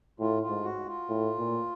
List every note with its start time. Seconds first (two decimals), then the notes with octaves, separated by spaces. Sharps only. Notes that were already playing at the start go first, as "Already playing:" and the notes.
0.20 A2 F4
0.43 F4
0.49 G#2
0.64 F#4
0.87 F4
1.09 A2
1.39 A#2